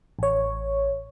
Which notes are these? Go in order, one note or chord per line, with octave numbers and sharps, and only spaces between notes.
A1 C#5